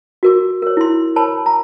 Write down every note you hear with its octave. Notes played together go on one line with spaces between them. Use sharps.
F#4 A#4 D6
A#4 C#5
E4 C6
A#4 C#5 A5 B5
A#5